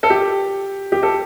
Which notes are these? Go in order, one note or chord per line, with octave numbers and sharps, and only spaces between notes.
A4
G4
G4
A4